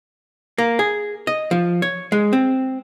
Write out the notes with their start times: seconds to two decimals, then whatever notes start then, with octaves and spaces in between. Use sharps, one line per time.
0.58 A#3
0.79 G#4
1.27 D#5
1.51 F3
1.82 C#5
2.12 G#3
2.33 C4